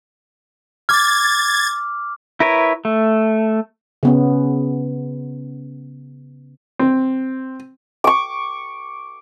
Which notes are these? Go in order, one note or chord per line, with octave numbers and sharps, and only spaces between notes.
D6 F6 G#6 A6
E4 A#4 B4 C#5
A3
C#3 B3 C#4
C4
C#6 D6